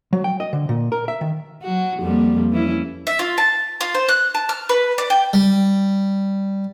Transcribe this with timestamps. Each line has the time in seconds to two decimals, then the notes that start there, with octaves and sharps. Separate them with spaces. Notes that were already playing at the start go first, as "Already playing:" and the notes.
0.13 F#3
0.24 G5
0.40 D#5
0.53 D3
0.69 A#2
0.92 A#4
1.08 E5
1.21 D#3
1.62 F#3 F#4
2.00 F2 G3 A#3
2.51 E3 C#4 E4
3.07 E5
3.19 F4
3.38 A5
3.81 F4
3.94 C5
4.09 F#6
4.35 A5
4.49 F6
4.69 B4
4.98 D5
5.10 G5
5.33 G3